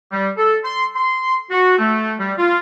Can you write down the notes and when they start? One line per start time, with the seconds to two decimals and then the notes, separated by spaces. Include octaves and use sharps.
0.12 G3
0.38 A4
0.64 C6
0.96 C6
1.50 F#4
1.78 A3
2.18 G3
2.38 F4